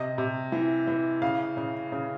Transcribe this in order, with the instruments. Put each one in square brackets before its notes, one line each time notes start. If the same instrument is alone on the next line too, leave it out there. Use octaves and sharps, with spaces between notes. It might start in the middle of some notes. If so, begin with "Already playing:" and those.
Already playing: [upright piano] C3 D#5
C3
E3
E3
C#3 F5
C#3
C#3